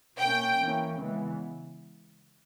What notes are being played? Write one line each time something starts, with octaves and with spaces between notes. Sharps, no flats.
B2 A#3 C#4 G5
E3 A#3 C#4
C#3 E3 G#3 B3